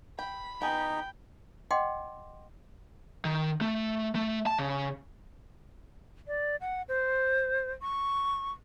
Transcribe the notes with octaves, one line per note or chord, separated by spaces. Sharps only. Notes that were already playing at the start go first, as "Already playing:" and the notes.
G5 B5
B3 D#4 G#4 G5
D#5 F#5 G5 C6 D6
D#3
A3
A3
A5
C#3
D5
F#5
C5
C#6